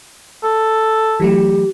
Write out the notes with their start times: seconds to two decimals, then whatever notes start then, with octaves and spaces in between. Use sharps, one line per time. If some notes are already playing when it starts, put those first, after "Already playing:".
0.44 A4
1.20 E3 F#3 A3 G4